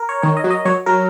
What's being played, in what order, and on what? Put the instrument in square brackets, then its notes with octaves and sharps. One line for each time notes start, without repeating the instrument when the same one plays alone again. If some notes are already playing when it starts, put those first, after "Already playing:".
Already playing: [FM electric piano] A#4
C#5
[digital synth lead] D#3 [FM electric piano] C#5
[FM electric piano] D#5
[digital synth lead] F#3
[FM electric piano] D#5
[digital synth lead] F#3 [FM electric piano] C#5
[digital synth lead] F#3 [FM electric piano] A#4